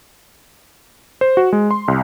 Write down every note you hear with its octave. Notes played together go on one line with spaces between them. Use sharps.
C5
F#4
G#3
C6
C2